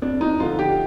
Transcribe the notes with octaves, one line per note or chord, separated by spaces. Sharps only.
F2 D4
D#4
D3 F3 F4
G4